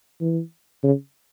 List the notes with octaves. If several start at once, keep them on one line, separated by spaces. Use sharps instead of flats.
E3
C#3